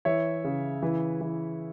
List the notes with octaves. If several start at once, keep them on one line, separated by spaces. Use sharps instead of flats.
E3 C#5 E5
C#3
E3
E3